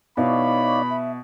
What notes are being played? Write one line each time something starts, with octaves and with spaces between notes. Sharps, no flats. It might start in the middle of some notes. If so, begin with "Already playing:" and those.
B2 D#4 E4 C#5 D5 F5 B5
E5